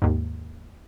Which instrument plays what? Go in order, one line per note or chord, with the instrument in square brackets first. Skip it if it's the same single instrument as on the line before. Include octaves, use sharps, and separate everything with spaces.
[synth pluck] D#2 G#2